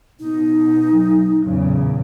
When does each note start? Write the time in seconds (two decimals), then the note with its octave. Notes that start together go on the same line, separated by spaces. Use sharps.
0.20 B2 D#4
0.92 F#3
1.42 E2 A#2 C#3 F#3